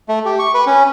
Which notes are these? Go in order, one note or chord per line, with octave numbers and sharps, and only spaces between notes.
A3
G4
C#6
B4
C#4